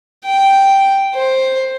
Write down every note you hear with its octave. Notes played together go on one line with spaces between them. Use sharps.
G5
C5